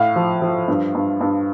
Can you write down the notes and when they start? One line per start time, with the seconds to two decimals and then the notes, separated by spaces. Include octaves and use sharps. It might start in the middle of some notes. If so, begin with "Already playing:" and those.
Already playing: A2 F5
0.16 F3
0.42 F3
0.68 G2
0.95 G2
1.21 G2